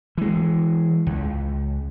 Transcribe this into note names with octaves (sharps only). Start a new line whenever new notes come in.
E3 G#3
C#2